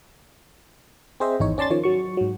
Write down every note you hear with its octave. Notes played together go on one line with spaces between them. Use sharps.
C4 G#4 C5 D#5 E5
G#1 E2 D#4 C#5
C#4 D5 A5 C6 A6
D#3 F3 C#4 C#5
F#3 C#6
G#2 F#3